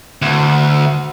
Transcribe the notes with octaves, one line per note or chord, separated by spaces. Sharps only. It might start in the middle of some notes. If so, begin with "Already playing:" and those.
D2